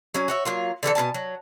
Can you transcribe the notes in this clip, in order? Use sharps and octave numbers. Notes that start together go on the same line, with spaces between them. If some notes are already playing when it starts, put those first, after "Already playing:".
F#3 C#4 G#5
F#4 C#5 E5
F#3 A#3 F4
D3 E3 G4 A4
B2 E4 G#5 A5
F#3